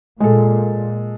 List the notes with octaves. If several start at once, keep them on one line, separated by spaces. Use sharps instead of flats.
A#2 G#3 A4